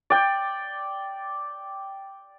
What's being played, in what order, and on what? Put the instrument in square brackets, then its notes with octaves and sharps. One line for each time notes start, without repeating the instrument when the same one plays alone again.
[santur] D5 G5